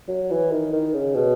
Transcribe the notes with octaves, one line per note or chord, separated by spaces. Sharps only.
F#3
E3
D#3
D#3
C#3
B2